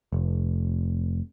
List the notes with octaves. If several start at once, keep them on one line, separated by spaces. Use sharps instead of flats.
F1